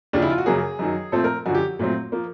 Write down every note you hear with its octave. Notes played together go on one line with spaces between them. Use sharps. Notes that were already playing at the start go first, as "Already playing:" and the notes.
D#2 C#3 F3 D4
E4
F4
F#4
F#2 C#3 F#3 A#3 G#4
F#2 D#3 F#3
A#2 F3 A3 C4 A4
A#4
F#2 D3 F3 F#4
G4
A#2 F#3 A3 C4
F3 A#3